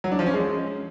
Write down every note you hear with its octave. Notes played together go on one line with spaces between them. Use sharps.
F#3
D4
F3
C#4
G#3